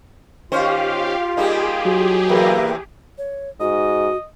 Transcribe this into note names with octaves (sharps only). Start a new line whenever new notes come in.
D#3 C#4 F4 G4 C5 F5
G3 A#3 D#4 G4 G#4
F#3
E2 C3 A#3 A#4 B4
C#5
G#2 F#4 D#5